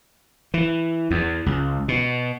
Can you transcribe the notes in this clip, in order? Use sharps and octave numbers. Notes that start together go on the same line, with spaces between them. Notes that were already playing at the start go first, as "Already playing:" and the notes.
E3
E2
C#2
B2